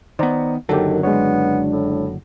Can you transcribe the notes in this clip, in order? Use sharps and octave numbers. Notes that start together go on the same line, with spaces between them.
D#3 B3 C5 D5 A#5
F#1 F#2 D3 D#3 F#3 G4 A4
G#3 B3 D4 C#5
A2